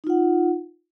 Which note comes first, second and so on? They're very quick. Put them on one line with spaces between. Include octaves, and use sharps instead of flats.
D#4 F4 F#5